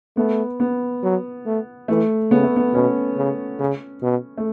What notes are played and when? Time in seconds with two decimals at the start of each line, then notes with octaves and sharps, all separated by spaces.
0.17 A3 B3
0.60 B3
1.03 F#3
1.46 A3
1.88 E3 A3
2.31 C#3 B3
2.44 A3
2.56 B3
2.74 B2 C#4
3.17 C#3
3.59 C#3
4.03 B2
4.37 A3